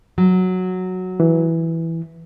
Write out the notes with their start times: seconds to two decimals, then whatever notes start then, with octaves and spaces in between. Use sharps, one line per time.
0.18 F#3
1.20 E3